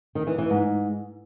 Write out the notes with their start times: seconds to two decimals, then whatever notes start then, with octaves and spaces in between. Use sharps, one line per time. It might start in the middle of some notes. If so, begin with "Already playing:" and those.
0.15 D#3
0.27 E3
0.38 E3
0.50 G#2